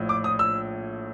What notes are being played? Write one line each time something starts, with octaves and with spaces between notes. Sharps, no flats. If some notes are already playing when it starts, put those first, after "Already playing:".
Already playing: A#1 A2 F3
D6
D#6
E6